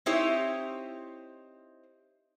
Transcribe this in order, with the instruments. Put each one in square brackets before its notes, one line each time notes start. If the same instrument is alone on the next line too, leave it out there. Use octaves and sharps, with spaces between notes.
[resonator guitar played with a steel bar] C4 D#4 E4 G4 C5 C#5